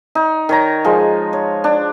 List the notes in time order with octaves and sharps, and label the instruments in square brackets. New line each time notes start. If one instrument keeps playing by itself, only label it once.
[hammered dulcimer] D#4
D#3 C#5 A#5
F3 G#3
C#5
D4